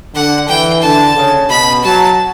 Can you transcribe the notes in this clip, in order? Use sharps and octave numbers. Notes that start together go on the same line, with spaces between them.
D3 F#5
E3 G5
D3 A5
C#3
B2 B5
F#3 A5